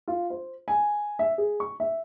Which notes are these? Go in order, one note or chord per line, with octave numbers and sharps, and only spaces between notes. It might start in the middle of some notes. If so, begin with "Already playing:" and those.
F4
C5
G#5
E5
G#4
C#6
E5